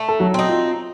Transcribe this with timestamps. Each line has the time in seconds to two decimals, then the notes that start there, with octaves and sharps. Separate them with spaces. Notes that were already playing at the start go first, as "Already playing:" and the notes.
Already playing: A3
0.09 A4
0.20 F#3 F#4
0.34 C4 D#4
0.49 F4